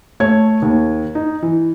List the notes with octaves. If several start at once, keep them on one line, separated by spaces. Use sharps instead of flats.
A3 C#5 G#6
D#2
D#4
E3